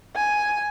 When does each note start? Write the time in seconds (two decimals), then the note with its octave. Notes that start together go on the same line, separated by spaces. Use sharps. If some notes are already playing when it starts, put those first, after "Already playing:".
0.15 G#5